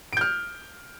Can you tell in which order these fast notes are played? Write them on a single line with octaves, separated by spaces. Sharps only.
D7 G6 F6